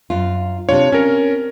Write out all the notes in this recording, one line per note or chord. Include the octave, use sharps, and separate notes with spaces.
F#2 F4
C3 D4 F4 C#5
C4 C#4 A#4